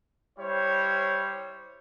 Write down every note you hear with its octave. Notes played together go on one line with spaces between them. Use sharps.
G3 E4 C5 C#5